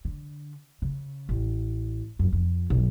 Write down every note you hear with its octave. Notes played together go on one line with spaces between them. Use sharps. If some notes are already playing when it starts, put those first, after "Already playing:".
D3
C#3
A1
F#2
F2
B1 G2